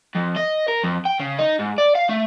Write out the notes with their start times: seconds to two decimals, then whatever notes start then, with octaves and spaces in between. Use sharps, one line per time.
0.15 F2
0.37 D#5
0.68 A#4
0.83 F2
1.05 G5
1.20 C#3
1.39 D#4
1.59 G#2
1.78 D5
1.95 F5
2.09 A3